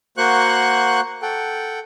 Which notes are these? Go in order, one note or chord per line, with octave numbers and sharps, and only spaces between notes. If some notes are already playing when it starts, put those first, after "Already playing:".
A#3 F#4 C5 F#5 C#6 F#6
A4 F#5 G5